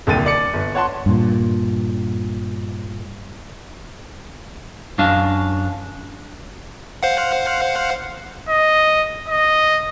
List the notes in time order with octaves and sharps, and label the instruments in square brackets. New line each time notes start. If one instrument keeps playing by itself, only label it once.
[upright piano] D#1 C2 D3 G5 A6 D#7
D5 C#7
G1
C#5 F#5 A5 C6
[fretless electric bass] G2 A#2
[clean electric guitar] F#2 F#3 D4 F5
[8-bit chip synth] C5 F5 F#5
[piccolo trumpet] D#5
D#5